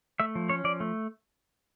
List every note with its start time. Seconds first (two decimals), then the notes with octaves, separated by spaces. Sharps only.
0.20 A3 E5
0.35 F3
0.49 C#4 C#5
0.64 F3 D5
0.80 A3